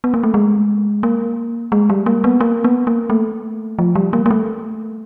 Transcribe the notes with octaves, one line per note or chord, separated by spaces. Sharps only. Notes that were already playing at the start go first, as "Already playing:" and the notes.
B3
A#3
A3
G#3
A#3
G#3
G3
A#3
B3
A#3
B3
A#3
A3
F3
G3
A#3
A#3
A3